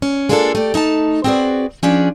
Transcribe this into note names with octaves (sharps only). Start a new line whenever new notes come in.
C#4
G#3 A#3 D4 F4 G4 A4
A3 G4 D5
A3 D#4 E5 A5
C4 F#4 G#4 B4 D5
F3 C#4 D4 G#4